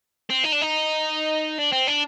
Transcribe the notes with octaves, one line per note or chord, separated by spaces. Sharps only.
C4
D#4
D4
D#4
D4
C4
D4